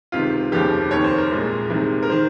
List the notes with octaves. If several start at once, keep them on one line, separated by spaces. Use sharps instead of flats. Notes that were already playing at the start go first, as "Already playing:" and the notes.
C#2 C3 D#3 F4
F1 D#2 C#3 F3 G4
F1 D#2 D#3 C#5
C5
A#4
C2 A#2 G#3
C2 C3 D#3 G#3
A#4
D#3 C5